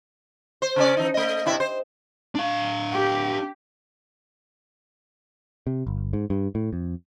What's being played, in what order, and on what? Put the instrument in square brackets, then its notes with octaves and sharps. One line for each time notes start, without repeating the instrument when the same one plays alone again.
[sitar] C5
C#3 C#4 D5
E3 D#4
A3 D#5
G2 C3 E4
C5
[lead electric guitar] D4 F5
[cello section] G4
[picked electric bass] C3
G1
G#2
G2
A2
F2